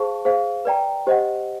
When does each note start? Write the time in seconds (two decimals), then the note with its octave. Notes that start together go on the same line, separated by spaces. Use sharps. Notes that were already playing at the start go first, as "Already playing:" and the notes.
Already playing: G#4 C5 F5 A5 C#6
0.25 G#4 C5 F5
0.65 B4 D5 G5 A#5
1.07 G4 C5 D#5 F#5